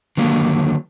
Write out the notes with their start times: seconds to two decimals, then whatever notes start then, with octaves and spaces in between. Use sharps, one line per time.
0.17 D3 D#3 F#3 A#3